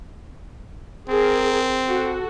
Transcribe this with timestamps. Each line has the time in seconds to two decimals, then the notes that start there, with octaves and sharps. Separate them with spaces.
1.09 C4 G#4 A#4
1.86 F#4 A4